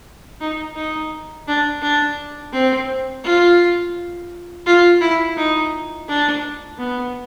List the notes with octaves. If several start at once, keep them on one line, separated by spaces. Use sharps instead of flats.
D#4
D#4
D4
D4
C4
F4
F4
E4
D#4
D4
B3